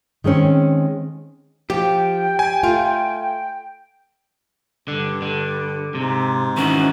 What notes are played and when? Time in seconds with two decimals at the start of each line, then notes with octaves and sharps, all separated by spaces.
0.24 D#3 G#3 C4 C#4
1.70 F3 G4 G5
2.39 G#5
2.63 A3 F4
4.88 G2 D3
5.22 D3
5.95 G#2 C3
6.57 D#3 E3 C#4 F#4